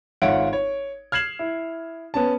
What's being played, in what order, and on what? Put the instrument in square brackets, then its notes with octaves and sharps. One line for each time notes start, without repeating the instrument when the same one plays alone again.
[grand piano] G#1 F4 C#5 E5 F#5 D7
C#5
F6 G#6 C7 E7 F#7
E4
B3 C#4 A5